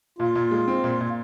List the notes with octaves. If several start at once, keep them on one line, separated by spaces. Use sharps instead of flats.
A#2 F4
A#2
G#3
C4
A#2
A#2